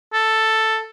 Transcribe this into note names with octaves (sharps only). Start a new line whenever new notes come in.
A4